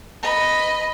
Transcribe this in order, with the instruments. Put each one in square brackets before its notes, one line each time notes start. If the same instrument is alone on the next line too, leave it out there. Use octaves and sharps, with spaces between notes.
[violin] D#5 B5